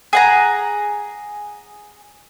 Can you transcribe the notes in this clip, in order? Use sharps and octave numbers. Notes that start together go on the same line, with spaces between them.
G#4 F#5 A#5